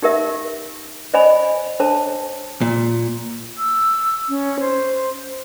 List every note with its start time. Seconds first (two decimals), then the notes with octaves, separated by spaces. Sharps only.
0.02 D#4 G4 A#4 E5
1.14 C5 D5 D#5 G#5 B5
1.80 D4 C5 C#5 A5
2.61 A#2
3.58 E6
4.29 C#4
4.60 C5